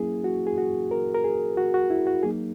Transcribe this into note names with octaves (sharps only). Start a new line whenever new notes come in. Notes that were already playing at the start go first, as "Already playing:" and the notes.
Already playing: F#3 A#3 C#4 E4 G#4
F#4
G#4
F#4
A#4
A#4
G#4
F#4
F#4
E4
F#4
F#3 A#3 D#4 G#4